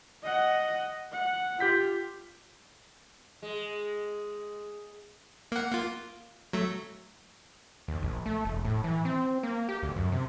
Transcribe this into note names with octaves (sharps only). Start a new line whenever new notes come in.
D#5 F#5
F#5
F4 G4 G6 B6
G#3
A#3 F#5
A#3 F4
F#3 A3
D#2
A#1
A3
E1
A2
E3
C4
A#3
G4
D2
F#2
C3